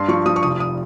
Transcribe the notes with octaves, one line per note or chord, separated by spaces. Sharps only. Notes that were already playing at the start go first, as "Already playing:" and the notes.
Already playing: G2 C6
F3 C#6
F3 D#6
C#6
F1 D#6
D#6